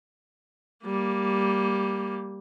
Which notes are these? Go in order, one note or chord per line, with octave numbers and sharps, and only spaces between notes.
G3 A#3